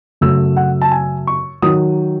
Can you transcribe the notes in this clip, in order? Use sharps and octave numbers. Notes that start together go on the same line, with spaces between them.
F#2 C#3 F#3 A3 E6
F#5
A5
G#5
C#6
D#3 F#3 D#6